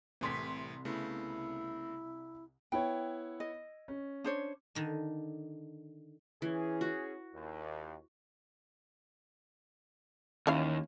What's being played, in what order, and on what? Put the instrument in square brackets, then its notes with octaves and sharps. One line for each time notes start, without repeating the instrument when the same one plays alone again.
[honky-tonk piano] C2 C6 B6 [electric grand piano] A2 E3
[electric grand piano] C#3 A3 B3 [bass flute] E4
[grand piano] B3 E4 C#5 [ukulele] G5
[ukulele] D#5
[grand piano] C#4
[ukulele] D4 C5 C#5
[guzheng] D3 D#3 D4
[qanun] E3 [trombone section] C#4 G#4
[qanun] F#4
[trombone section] D#2
[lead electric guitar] D#2 [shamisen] E3 C#4 F5